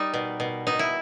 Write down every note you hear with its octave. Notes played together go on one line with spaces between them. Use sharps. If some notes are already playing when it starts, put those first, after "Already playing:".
Already playing: G3 D#4
B2
B2
B2 D#4
E4